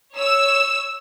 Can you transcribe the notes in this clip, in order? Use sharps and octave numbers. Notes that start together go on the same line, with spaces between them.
C#5 E6